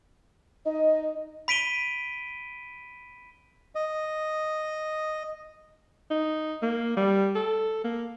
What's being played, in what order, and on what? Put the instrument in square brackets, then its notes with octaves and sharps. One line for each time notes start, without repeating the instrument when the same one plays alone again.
[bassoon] D#4 [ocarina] D#5
[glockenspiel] B5 B6 D7 D#7 G7
[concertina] D#5
[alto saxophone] D#4
A#3
G3
A4
A#3